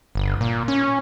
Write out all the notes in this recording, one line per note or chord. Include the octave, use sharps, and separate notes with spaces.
G1
A#2
C#4